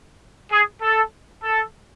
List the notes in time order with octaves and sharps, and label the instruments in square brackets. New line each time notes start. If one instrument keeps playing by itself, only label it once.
[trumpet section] G#4
A4
A4